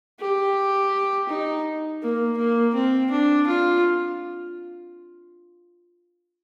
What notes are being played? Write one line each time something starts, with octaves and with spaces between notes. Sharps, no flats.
G4
D#4
A#3
A#3
C4
D4
F4